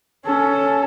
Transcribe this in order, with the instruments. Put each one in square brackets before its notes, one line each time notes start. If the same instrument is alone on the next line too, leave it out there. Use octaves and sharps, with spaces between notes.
[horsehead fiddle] C#4 A4